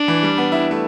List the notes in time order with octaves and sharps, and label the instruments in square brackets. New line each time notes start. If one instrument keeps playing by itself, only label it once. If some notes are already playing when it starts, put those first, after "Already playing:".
Already playing: [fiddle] D4
[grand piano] E3
G3
B3
E4
A3